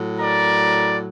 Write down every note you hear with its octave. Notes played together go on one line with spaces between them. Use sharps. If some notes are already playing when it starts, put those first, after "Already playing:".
Already playing: A2 F#3
A#4 D5